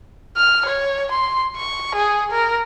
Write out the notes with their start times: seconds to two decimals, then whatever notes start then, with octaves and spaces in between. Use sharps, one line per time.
0.37 F6
0.66 C#5
1.12 C6
1.56 C#6
1.96 G#4
2.32 A#4